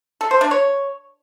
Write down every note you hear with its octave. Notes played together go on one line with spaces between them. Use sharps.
A4
C5
D4
C#5